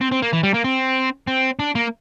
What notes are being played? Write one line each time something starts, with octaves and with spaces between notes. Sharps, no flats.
C4
C4
A#3
E3
G3
A#3
C4
C4
D4
A#3